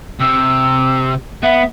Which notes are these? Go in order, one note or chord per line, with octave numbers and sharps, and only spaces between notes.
C3 E6
B3 E5